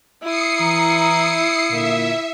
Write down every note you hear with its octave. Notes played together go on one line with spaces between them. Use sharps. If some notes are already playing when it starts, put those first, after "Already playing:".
E4 D#6 C7 C#7
E3 A#5
A#2 D3 A#3 E5